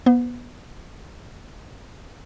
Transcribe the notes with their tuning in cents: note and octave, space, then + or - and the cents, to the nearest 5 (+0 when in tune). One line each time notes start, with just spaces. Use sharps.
B3 -25 B4 +40